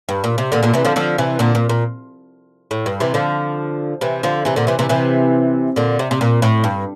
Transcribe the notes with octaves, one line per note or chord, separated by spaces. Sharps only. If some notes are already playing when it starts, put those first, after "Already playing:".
G2
A#2
C3
A#2 D3
A#2 D3
C3 E3
D3 F3
D3 F3
C3 E3
A#2 D3
A#2
A#2
A2
G2
C3 E3
D3 F3
C3 E3
D3 F3
C3 E3
A#2 D3
C3 E3
C3 E3
C3 E3
A#2 D3
C3
C3
A#2
A2
G2